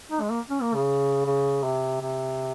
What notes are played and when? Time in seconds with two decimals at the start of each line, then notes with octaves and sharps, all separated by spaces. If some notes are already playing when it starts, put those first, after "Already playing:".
0.11 D#4
0.21 G#3
0.30 A#3
0.50 C#4
0.62 A#3
0.75 C#3
1.26 C#3
1.64 C3
2.01 C3